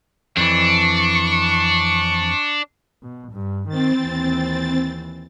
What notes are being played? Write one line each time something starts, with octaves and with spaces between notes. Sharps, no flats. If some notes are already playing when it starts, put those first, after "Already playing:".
F2 E3 D4 C#6
B2
G2
D#3 C4 A6
D#2 E3